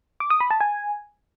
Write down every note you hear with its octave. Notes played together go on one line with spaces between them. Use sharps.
D6
D#6
B5
A5
G#5